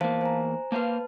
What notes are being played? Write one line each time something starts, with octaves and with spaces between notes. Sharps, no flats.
E2 A#3 C5 F5 A5
C5 G#5 A#5
A#3 B4 C5 F5 A5